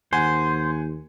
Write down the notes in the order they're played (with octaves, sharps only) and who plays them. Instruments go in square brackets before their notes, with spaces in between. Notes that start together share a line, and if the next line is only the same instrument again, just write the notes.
[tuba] D#2 [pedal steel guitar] C5 [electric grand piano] F#5 G#5